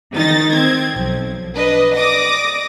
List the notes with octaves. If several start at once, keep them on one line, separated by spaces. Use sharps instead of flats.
D#3 D#4 A6 A#6
C4 G#6
B1 F3
D4 B4 D#5
D5 D6 D#6 A#6